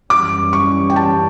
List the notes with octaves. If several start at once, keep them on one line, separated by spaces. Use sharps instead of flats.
F#2 E3 G3 C#4 D6
C#6
G5
A5